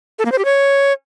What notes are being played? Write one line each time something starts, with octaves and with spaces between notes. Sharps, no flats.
A4
A#3
C5
G4
C#5